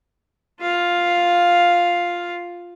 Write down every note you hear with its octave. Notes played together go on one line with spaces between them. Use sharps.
F4 F5